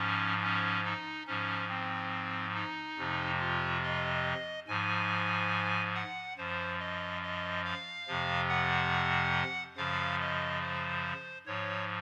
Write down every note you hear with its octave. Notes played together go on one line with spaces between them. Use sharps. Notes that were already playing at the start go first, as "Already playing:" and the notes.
Already playing: G#2 F3 C#4
C#4
D#4
G#2 F3 C#4
C4
D#4
F2 C3 F3
F4
D#5
G#2 F3 G#5
F#5
F#2 F3 C5
D#5
D#5
F5
F2 C3 F3
F#5
F#2 C#3 F3 F5
D#5
C5
G#2 F3 C#5